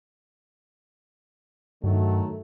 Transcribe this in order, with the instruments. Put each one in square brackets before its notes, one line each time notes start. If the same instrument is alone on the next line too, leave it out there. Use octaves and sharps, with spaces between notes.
[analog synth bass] G2 [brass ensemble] D#3 F#3 A3